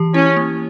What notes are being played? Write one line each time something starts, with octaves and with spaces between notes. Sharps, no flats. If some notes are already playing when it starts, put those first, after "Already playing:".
Already playing: E3 G4
C#4 E4
A#3